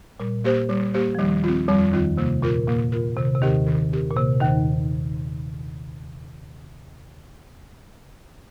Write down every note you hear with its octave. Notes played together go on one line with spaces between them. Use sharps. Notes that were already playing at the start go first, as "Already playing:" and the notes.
A#2 G3
A#3 G4 C5
G3
A#3 G4 C5
F3
D#2 D#3 G3
C4 F4
F2 F3 G3
D#2 D#3 C4 F4
C3 A#3
A#2 F4 A#4
A#2 A#3
F4 A#4
C3 D#3
C3
D#2 D#3 C4 G4 A#4
D#3
C4 G4 A#4
A#2
C3 A#3
D#2 D#3 D#4 C5